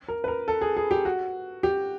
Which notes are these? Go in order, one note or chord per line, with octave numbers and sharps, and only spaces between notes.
A#4
B4
A#4
A4
G#4
G#4
G4
F#4
G4